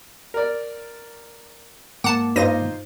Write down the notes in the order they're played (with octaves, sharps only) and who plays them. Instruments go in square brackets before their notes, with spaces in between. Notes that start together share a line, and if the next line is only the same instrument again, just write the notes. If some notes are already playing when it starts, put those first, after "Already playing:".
[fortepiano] A#4 D5
[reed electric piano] G#2 A#3 D6 [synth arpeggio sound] F#5 A5
[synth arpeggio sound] G2 A#6 D#7 [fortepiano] D#4 F4 C5